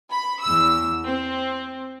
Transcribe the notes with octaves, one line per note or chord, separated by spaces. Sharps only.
B5
E2 E6
C4